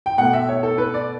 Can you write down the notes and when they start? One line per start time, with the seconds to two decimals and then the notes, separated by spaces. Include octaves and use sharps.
0.06 G5
0.18 B2 A3 F#5
0.33 E5
0.49 C#5
0.63 A4
0.78 B4
0.94 D5